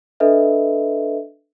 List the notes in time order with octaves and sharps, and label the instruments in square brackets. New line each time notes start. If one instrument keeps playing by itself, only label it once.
[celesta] D4 A4 B4 D#5 E5